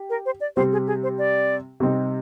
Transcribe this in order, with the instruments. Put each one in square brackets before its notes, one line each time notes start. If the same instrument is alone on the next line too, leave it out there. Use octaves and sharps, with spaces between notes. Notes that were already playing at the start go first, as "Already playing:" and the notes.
Already playing: [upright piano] G4
[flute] A#4
C5
D5
[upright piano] C3 G3 C4 G4 [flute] C5
[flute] G#4
G#4
C5
D5
[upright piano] C3 G3 C4 D#4